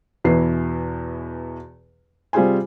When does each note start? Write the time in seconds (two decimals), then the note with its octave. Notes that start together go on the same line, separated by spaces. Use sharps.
0.24 E2 B2 E3 C7
2.33 C3 G3 F4 G#4 C5 G#5